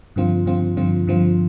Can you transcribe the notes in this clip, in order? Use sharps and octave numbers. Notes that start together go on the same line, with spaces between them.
G2 D3 F3 C4 F4
G2 D3 F3 C4 F4
G2 D3 F3 C4 F4
G2 D3 F3 C4 F4